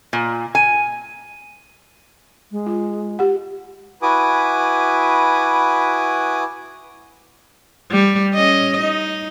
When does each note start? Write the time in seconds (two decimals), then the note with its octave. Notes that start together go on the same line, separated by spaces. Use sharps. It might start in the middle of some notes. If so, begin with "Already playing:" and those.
0.13 A#2
0.55 G#5
2.51 G#3
2.66 F4
3.19 G4 F#5
4.02 E4 F#4 B4 G#5 D6 D#6
7.91 G3
8.34 C#4 D#5
8.81 D#4